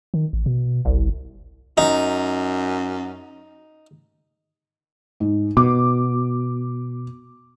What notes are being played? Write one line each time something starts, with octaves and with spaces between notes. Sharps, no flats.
D#3
A1
B2
G1 C2
F#2 D#4
G#2
B2 D6